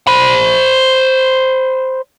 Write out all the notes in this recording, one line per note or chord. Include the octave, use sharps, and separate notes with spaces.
C5 B5